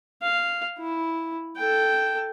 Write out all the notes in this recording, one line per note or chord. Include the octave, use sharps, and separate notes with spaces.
F5
E4
A4 G5